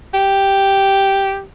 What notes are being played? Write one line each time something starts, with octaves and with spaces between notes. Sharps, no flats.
G4